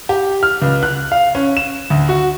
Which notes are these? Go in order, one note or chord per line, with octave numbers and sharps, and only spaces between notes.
G4
F6
C#2
F#6
F5
C#4
E7
D2
F#4